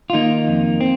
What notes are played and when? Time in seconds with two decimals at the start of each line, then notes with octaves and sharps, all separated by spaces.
0.10 F4
0.13 D#3 A#3 D#4
0.48 F2
0.81 C4